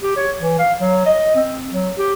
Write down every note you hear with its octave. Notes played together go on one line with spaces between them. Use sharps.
G4
C#5
E3
F5
F#3
D#5
C4
F#3
G4